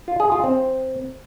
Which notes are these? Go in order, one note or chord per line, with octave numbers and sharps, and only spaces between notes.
F4
G#4
F4
C4